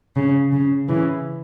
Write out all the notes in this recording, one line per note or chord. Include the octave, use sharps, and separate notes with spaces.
C#3
C#3
C#3 E3